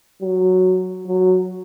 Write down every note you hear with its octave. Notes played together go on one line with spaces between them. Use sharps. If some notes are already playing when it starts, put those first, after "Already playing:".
F#3
F#3